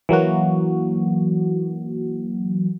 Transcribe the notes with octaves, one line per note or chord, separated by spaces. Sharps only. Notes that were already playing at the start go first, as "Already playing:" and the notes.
E3 F#3 A#3 F#4